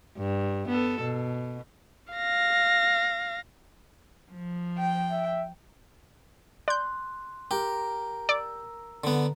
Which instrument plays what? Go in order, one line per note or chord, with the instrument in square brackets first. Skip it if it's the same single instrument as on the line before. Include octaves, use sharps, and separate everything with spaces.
[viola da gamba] G2
B3 A4
B2
[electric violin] F5 A#6
[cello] F3
[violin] G5
[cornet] E5
[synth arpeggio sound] D5 G6 [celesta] C6 F#6
[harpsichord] G4 [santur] A#4
[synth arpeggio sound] D5 [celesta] E6
[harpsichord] D3 B3